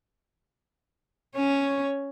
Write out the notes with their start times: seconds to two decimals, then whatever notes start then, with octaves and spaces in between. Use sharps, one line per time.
1.36 C#4 C#5